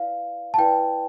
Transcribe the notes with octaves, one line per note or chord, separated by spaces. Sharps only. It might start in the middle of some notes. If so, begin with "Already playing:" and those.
Already playing: E4 B4 D5 F5
A5
E4 B4 D5 G5